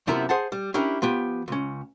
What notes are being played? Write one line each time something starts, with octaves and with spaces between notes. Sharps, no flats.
F#2 C3 F3 B3 E4 A#4
G#4 C5 F#5 A5
G3
C#4 D4 E4 G4 A#4
F3 B3 G4
C#2 C#4